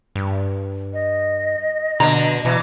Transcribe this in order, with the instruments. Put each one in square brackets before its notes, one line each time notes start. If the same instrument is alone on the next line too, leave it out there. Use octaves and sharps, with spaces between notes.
[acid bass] G2
[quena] D#5
[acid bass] B2 [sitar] D3 [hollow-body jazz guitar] A#5
[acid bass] B2 [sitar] E3